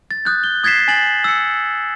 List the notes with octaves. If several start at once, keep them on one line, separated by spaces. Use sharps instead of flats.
A6
D#6 F#6 G6
G7
D#6 G#6 A6 B6 C7 E7
G#5 G#6 A6 F#7
E6 C#7